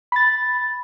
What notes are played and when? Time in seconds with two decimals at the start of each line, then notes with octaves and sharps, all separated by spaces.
0.12 B5 A6